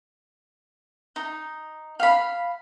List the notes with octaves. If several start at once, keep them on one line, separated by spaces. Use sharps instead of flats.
D#4
F5 B5